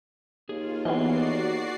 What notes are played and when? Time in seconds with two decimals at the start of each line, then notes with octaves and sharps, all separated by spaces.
0.49 D#2 F4 G#4
0.85 E3 B3 F#4 G#4 D5 D#5 C7